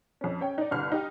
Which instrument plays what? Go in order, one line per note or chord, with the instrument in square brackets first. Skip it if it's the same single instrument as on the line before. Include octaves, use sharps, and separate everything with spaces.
[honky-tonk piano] F2 C#4
C#4 C#5 G5
D#4 D5
G1 C2 F6
D#4 G4